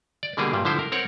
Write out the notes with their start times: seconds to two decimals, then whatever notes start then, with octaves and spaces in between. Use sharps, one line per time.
0.23 D5
0.37 B2 D3 G3 A#3 G#4
0.53 G2 A#2 G3
0.65 D3 F3 E4 C5
0.79 A#4
0.92 C4 A#4 C#5 F#5